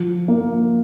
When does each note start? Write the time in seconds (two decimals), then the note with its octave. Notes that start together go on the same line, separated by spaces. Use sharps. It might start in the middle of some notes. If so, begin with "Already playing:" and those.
Already playing: F3
0.28 A#3